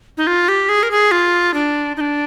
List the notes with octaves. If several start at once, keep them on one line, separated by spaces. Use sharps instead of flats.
D#4
F4
G4
G#4
A#4
G#4
F4
D4
D#4
D4